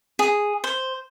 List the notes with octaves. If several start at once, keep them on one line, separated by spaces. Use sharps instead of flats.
G#4
C5